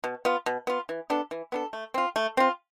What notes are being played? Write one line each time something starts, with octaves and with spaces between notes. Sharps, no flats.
B2
B3 F4
B2
B3 F4
E3
B3 D4 A4
E3
B3 D4 A4
A3
C4 F4
A3
C4 F4